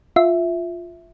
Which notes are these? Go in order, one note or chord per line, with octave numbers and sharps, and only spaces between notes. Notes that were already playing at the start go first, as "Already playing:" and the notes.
F4 E5